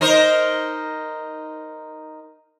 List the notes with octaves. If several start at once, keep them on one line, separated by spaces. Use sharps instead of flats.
D#4 A#4 C5